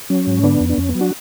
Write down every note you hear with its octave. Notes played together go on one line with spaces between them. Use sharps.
F#3 C#4
G#2
D3 B3 D4
F2
D4
F2 C#4
B3
F#3
D4 F#4